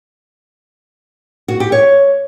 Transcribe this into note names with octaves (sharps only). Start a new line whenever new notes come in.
F#4
G4
C#5